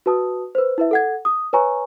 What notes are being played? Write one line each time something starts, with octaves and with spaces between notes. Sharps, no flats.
F#4 B4 A5 D#6
B4 C5
E4 B4 E5
A4 F#5 G#6
D#6
B4 C#5 G#5 A#5 C#6